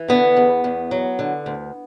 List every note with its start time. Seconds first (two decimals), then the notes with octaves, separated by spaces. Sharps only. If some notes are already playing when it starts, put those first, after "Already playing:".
Already playing: E3
0.08 D3 B3
0.36 E2
0.64 E2
0.91 F#3
1.19 D3
1.46 D2